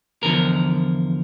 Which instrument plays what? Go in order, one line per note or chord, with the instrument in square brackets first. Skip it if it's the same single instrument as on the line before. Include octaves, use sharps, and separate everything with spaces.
[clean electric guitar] E2 D3 F3 A#4